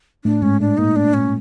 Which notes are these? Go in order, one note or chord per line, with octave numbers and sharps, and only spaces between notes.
A2 A3 D4
G#2 G#3 C#4
A2 A3 D4
A#2 A#3 D#4
A2 A3 D4
A#2 A#3 C#4